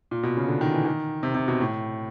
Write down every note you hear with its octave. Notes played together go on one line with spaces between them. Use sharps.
A#2
B2
C#3
D3
D#3
E3
D#3
C3
C3
B2
A2